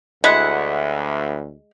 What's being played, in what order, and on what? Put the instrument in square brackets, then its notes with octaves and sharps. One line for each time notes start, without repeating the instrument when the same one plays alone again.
[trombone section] D2 [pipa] G#3 [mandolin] E4 F#5